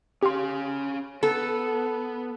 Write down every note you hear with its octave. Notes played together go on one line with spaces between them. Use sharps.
C#4 G4 F5 C6
B3 A4